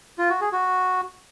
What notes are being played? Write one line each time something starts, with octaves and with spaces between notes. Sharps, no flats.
F4
F#4
G#4
F#4